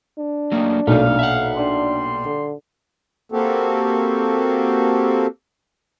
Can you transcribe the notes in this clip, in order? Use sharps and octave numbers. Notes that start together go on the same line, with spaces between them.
D4
D#3 F#3 A3 A#3
B1 A#2 A3 D#4 F5
E5 F#5
G3 D4 C6
D3
A#3 C4 F#4 G4 A4